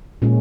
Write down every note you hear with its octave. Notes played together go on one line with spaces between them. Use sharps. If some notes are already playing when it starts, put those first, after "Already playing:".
A#2 G#3 C#4